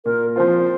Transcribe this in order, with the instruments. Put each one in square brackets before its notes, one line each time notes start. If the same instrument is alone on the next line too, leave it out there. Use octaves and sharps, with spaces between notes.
[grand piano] A#2 [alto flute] A#4
[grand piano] F3 C4 F4 [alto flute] C5